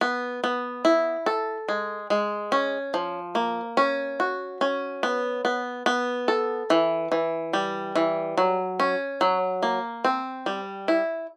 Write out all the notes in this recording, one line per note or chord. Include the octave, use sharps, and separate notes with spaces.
B3
B3
E4
A4
G#3
G#3
C#4
F3
A#3
C#4
F#4
C#4
B3
B3
B3
A4
E3
E3
G3
E3
F#3
C#4
F#3
A#3
C4
G3
E4